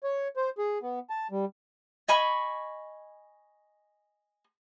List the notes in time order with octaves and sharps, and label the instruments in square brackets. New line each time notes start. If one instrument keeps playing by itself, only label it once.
[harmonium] C#5
C5
G#4
B3
A5
G3
[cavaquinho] D#5 G#5 B5 C#6